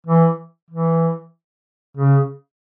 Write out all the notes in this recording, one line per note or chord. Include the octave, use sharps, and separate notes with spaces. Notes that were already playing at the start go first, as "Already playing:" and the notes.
E3
E3
C#3